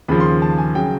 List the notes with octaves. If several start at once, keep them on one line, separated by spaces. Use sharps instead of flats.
D#2 C#3 F3 B5
C6
A5
G#5
C#3 F#3 G5